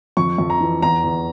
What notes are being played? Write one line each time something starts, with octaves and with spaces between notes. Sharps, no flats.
F2 C#6
F2
A#5
E3
E2 A#5
E2